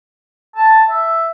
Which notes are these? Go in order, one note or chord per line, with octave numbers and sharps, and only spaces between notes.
A5
E5